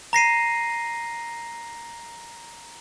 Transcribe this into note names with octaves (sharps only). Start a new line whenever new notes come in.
A#5 A#6 C7 D#7